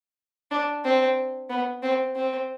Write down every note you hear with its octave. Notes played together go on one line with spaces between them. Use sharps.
D4
C4
B3
C4
C4